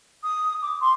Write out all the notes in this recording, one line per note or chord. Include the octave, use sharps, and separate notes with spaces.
D#6
D6
C6